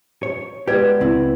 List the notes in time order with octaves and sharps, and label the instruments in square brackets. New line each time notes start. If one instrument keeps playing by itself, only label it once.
[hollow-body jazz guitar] C#5
[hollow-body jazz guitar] G#3 G4 [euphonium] B3 [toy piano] B4 D5
[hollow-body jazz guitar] C#2 C4 E4